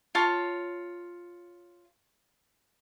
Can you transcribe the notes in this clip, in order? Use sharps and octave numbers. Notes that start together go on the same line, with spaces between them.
F4 C#5 A5